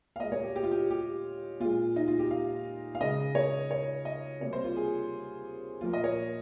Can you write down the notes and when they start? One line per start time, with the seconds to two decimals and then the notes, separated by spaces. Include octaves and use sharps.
0.16 F5
0.20 A#2 G#3 D#5
0.32 C#5
0.43 G4
0.56 G4
0.63 F4
0.71 G4
0.90 G4
1.60 A#2 G#3 F4
1.96 D#4
2.08 F4
2.19 G4
2.31 F5
2.95 F5
3.00 C#3 G#3 D#5
3.35 C#5
3.71 C#5
4.05 D#5
4.40 C3 G3 A#3 C#5
4.53 C5
4.64 F4
4.76 G#4
5.81 A#2 F3 A#3 F4
5.93 D#5
6.04 C#5